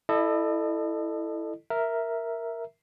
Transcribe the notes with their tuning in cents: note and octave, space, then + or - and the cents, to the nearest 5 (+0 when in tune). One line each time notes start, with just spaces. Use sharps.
E4 +0 A4 +0 D#5 -40
A#4 +0 E5 +0